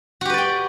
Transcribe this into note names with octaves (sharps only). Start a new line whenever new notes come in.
F#4 G4 B4 D5 G5